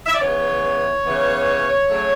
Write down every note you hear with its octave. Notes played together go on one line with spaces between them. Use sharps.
E5
D5
C#3 E3 B3 C#5
C#3 E3 B3
C#3 F#3 A3